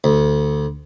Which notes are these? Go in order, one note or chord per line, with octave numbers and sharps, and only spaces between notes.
D2